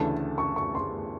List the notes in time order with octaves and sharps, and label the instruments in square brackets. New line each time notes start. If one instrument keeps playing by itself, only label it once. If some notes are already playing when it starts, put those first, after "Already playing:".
Already playing: [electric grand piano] D2 C#3 E3 A3 D4 [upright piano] A5
[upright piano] C#6
C#6
C6